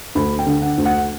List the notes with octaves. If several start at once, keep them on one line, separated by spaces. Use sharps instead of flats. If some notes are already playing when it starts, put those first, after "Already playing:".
D2 B5
G5
D3
F#5
D2
F#5